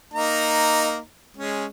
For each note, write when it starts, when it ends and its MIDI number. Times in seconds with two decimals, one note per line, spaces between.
0.14 0.97 58
0.14 0.97 63
0.14 0.97 82
1.37 1.66 56
1.37 1.66 61